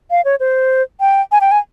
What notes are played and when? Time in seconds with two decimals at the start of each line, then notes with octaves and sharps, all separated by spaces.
0.11 F5
0.25 C#5
0.40 C5
1.00 G5
1.32 G#5
1.41 G5
1.51 G#5